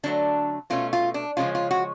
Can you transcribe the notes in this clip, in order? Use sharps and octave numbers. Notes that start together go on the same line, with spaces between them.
D3 F#3 A3 D4
B2 A3 C#4 F4
F4
D4
C#3 F3 G#3 C#4 F4
F4
F#4